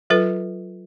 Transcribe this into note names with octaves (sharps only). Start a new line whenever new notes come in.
F#3 F4 A4 B4